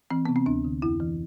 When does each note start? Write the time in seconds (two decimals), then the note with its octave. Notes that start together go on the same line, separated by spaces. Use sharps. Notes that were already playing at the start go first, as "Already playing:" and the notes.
0.10 E3 C4
0.26 C3 B3
0.36 C4
0.46 D2 D4
0.64 D3
0.82 F2 E4
1.00 E3